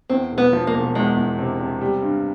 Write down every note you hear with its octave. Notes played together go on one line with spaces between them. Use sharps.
E2 C4
E1
B3
F3
A#3
E1
E2 G#3
E2
C3
C3
G3
G2